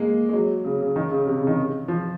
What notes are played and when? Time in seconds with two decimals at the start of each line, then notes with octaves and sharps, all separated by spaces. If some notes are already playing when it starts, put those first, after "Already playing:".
Already playing: G#3 A#3
0.29 G#3
0.34 F#3
0.65 C#3
0.81 C#3
0.96 D#3
1.11 C#3
1.27 C3
1.37 C#3
1.47 D#3
1.88 F3